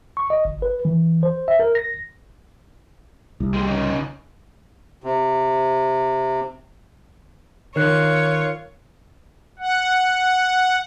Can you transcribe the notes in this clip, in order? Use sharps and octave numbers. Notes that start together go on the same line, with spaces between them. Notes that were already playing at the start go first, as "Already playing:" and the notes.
C#6
D#5
G1
B4
E3
C5
E5
A#4
A#6
C2
G#3 G4
C#3 D#4
C3
D#3 F4 A#4 C#5 F#6
F#5